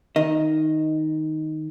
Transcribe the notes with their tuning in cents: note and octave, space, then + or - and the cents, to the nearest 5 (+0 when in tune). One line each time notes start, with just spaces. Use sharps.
D#3 +0 D#5 +0